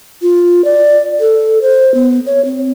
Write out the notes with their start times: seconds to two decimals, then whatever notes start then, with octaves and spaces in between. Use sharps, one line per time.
0.22 F4
0.65 D5
1.20 A4
1.62 C5
1.94 B3
2.26 C#5
2.45 C4